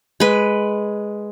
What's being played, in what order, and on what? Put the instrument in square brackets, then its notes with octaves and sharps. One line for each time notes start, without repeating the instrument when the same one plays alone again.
[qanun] G#3 B4